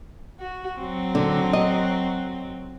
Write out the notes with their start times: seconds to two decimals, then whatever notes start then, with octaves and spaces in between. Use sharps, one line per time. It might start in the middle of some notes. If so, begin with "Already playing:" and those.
0.40 F#4
0.78 F#3 C4 F#4
1.15 D3
1.53 D#5